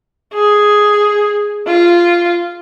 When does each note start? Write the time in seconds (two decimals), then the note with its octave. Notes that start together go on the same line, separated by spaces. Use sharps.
0.34 G#4
1.67 F4